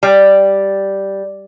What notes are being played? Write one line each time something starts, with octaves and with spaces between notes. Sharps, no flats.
G3